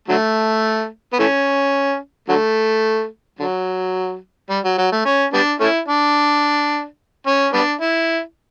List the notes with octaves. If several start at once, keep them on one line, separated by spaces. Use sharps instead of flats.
D3 F#3 A3
B3
E3 A3 C#4
D3 F#3 A3
D3 F#3
G3
F#3
F#3
A3
C#4
G3 B3 D4
A3 C#4 E4
D4
C#4
G3 B3 D4
E4